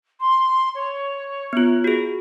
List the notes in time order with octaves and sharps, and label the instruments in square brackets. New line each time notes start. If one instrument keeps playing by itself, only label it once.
[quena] C6
C#5
[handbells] B3 F4
F#4 G#4